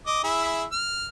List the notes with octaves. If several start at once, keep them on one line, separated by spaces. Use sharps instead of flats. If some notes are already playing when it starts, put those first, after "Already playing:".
D#5 D6
E4 G#4 E5
F6